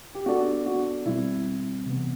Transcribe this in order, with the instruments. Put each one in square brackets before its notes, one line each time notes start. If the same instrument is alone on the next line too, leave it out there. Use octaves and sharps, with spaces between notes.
[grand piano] G4
[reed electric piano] B3 D4 A4 D5 [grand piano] F#4
[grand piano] F#4
[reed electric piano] B2 G3 C4 [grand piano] E4
[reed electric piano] C3 E3 B3